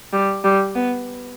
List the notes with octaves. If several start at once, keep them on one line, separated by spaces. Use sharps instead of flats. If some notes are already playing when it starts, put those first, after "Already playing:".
G3
G3
B3